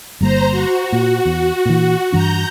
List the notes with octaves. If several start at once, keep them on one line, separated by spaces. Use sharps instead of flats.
G1 G3 A#3 C5 A#5
F#4
A#2
E2
A#2 E3
G2 E3 D4 A#5 G6